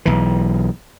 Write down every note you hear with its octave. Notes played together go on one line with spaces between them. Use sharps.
B1 E3